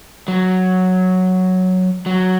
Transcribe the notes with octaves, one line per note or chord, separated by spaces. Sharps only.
F#3
F#3